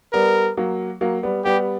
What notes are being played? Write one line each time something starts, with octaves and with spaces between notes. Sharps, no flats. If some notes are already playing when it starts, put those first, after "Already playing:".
G3 B3 A#4
F#3 A#3
F#3 A#3
G3 B3
G3 B3 G4